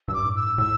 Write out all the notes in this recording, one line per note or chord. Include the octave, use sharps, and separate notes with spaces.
G2 E6
D6
A2
E6
G2
A2 E6